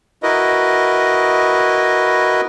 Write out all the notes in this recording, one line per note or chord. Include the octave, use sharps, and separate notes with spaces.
E4 F#4 A#4 B4 D#5